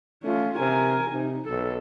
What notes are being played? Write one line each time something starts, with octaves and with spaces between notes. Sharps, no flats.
A3 C#4 F4
C3 A#4 G#5
C3 D#4
B1 A4